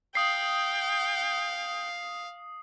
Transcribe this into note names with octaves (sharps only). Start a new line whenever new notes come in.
F5 G5 D#6 C7